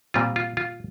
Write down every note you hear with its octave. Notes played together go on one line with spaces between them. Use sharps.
A#2 G3 C4 F4
F4
F4